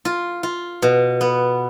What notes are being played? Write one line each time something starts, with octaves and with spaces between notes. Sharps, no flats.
F4
F4
B2
B3